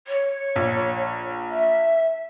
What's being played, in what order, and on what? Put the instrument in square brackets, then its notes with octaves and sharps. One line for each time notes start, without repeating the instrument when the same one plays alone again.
[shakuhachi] C#5
[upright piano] A#1
[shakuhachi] E5